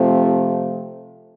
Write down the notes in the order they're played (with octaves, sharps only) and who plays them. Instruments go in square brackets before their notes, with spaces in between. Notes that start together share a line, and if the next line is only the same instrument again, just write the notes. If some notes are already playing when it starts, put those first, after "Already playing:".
Already playing: [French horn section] C3 F3 A3